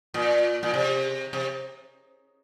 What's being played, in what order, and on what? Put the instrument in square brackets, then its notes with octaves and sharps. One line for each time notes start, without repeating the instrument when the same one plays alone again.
[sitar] A#2
A#2
C3
C3